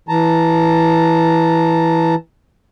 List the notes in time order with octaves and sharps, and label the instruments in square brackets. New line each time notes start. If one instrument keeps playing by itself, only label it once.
[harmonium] E3 A5 A#5